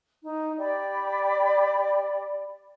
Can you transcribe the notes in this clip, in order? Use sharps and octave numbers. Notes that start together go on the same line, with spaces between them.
D#4
G4 D5 B5